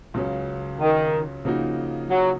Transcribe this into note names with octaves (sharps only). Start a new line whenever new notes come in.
C#2 C#3 F#3 C#4
D#3
C#3 F3 A#3 D#4 F#4
F#3